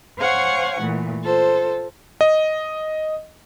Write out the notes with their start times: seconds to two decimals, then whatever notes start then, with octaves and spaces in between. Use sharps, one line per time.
0.18 C5 C#5 F5 F#5 G#5 C#6
0.79 A#2 E3 A3
1.22 F4 A4 C5
2.21 D#5